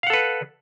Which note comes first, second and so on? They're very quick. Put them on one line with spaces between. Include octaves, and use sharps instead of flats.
F5 F#5 A4 B4